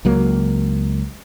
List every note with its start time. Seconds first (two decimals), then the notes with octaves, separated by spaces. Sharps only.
0.05 C#2 F#3 A#3